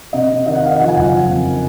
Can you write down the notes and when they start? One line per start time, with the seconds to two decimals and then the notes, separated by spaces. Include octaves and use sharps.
0.13 C3 D#5
0.30 C3
0.46 D#3 D#5
0.55 F#5
0.63 D#3 F5
0.71 D#5
0.79 F3 F#5
0.88 G#5
0.96 F#1 F#5
1.05 F5
1.13 F3
1.29 F2